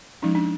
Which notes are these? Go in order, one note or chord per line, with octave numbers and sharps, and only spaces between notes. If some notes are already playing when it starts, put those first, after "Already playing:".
F3 G#3 C#4 D#4
D4